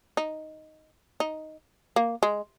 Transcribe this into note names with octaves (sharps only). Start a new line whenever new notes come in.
D#4
D#4
A#3
G#3